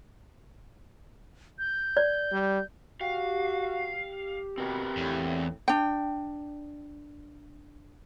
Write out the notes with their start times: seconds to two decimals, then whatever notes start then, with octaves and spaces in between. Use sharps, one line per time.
1.59 G6
1.97 D5
2.32 G3
3.01 F#4 G4 F5
4.58 B2 C4 A#4 B4
4.97 E2 A2
5.68 D4 G5